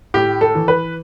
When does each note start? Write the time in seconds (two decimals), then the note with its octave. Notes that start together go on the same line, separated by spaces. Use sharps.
0.14 A2 G4
0.41 A4
0.55 E3
0.68 B4